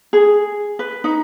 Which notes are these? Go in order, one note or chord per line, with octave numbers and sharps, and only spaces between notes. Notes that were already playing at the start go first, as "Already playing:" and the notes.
G#4
B4
D#4